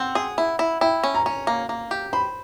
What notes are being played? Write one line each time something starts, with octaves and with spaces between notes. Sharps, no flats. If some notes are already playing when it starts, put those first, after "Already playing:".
Already playing: C4 F#5
G#4
E4
E4
E4 G5
C#4
A#5
C#4
A#3
A#3
G4
C5 B5